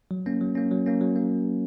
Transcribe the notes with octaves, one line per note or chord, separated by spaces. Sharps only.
F#3
A#3 C#4
F#3
A#3 C#4
F#3
A#3 C#4
F#3
A#3